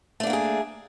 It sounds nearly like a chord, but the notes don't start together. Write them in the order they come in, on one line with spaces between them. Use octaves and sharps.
A3 D4 A#3 F#4 G#4